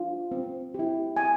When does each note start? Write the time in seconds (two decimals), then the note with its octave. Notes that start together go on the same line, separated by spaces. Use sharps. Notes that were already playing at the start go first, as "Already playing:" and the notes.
Already playing: D4 F4
0.32 C4
0.74 E4 G4
1.16 C4 G#5